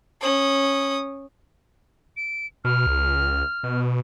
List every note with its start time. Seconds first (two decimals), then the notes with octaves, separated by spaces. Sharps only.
0.21 C#4 D#6
2.17 D7
2.65 B2 F6
2.86 C#2
3.63 B2